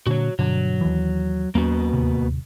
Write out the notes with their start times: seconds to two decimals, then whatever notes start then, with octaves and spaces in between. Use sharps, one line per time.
0.07 A#2 D3 F#4 C#5
0.39 G2 B2 D3 F#3
0.81 D#2 E3
1.55 D#2 F#3 A#3 B3 C#4 F#4
1.93 D1 D#2 C3